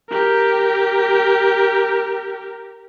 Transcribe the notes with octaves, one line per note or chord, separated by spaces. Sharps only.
G4 A#4